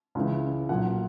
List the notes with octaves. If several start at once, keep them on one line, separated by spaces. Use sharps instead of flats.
C#2 C#3 E3
B1 A#2 F#5